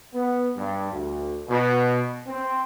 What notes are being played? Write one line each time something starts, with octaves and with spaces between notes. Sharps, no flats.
B3
G2
D2
B2
C4